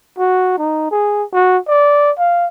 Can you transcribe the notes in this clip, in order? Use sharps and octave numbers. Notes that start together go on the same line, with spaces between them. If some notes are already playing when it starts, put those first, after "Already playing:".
F#4
D#4
G#4
F#4
D5
F5